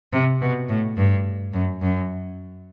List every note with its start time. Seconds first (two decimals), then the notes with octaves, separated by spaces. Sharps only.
0.13 C3
0.41 B2
0.69 A2
0.97 G2
1.53 F#2
1.81 F#2